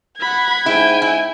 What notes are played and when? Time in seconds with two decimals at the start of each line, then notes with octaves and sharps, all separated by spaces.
0.20 F#5 B5 G#6
0.66 G#2 E4 G5 G#5
1.02 E4